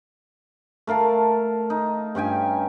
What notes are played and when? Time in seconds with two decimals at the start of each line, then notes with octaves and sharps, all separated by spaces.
0.87 A3 A#4 F5 A5
1.70 D#4
2.15 G2 C#4 G5 G#5